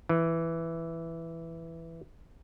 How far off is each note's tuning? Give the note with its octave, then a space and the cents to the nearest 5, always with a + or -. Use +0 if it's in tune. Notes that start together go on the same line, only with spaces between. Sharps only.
E3 +5